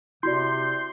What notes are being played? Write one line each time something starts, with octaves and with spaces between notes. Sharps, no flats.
C3 E4 F#4 D5 C6 G6